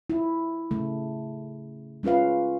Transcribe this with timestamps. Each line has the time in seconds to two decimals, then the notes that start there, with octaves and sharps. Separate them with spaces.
0.10 E4
0.71 C#3 A3
2.03 G#3 C#4 F4 B4 F5